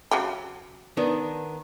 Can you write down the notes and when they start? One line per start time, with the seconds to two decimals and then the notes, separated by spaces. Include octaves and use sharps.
0.11 C#3 F#3 G4
0.97 D#3 B3 D4